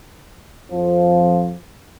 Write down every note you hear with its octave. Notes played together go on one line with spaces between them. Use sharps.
F2 F3